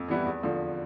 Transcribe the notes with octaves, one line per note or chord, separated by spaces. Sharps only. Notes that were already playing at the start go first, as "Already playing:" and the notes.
Already playing: F2
E3 G3 B3 E4
E2
D3 F3